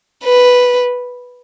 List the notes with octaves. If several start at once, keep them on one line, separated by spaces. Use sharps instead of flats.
B4